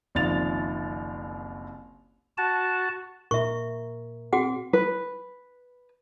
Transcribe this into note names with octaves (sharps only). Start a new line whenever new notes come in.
F#1 C2 D#3 F3 A6 F7
F#4 A5
A#2 A#4 E5 C#6
C4 F#4 G#4 F#5
B4